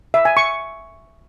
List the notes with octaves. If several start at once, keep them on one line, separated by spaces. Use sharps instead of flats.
E5
G#5
C#6